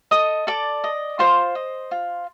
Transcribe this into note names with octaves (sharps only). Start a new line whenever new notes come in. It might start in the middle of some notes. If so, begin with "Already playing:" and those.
A4 D#5 D#6
A4 D5 D6
D#5
F4 C5 C6
D#5
F4